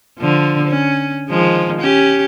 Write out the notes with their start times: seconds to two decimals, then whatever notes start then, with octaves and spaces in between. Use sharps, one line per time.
0.19 D3 F3
0.68 C#4
1.29 D#3 F3 G#3
1.80 C#4 G4